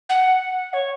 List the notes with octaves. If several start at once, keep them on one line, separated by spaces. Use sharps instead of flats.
F#5
C#5